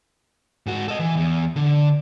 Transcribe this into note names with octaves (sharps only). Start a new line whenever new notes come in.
G#2 F#4
A4 D#5
E3
E2
D3